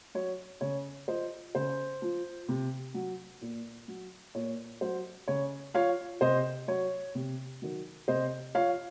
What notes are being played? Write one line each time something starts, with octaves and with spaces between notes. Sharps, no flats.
F#3 C#5
C#3 C#5
F3 C5 D#5
C#3 C5
F3
C3
F#3
A#2
F#3
A#2 C#5
F#3 C5
C#3 C#5
F3 C#5 F5
C3 C5 D#5
F#3 C#5
C3
D#3 F#3
C3 C5 D#5
F3 C#5 F5